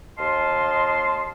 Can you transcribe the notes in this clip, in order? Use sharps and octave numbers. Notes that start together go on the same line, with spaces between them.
D#2 D#5 F5 A5 C6